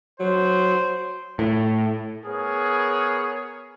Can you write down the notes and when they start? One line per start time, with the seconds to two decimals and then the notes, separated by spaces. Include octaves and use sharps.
0.20 F#3 C5
1.39 A2
2.26 B3 G#4 A#4 C#5